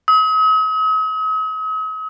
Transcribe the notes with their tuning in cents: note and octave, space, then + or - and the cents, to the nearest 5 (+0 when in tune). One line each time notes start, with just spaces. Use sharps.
D#6 +45